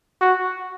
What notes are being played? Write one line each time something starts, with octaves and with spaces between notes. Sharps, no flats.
F#4